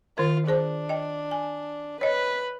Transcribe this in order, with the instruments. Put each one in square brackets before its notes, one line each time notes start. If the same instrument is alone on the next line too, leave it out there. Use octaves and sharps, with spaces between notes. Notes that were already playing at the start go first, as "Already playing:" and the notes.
[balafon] D#3 A#4 [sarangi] F4
[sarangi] D4 [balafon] G#4 C5 A5
[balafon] D#5 G5
G#5
[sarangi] B4 [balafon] C#5 D#5